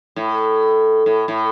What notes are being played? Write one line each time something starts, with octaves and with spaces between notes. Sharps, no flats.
A2
A2
A2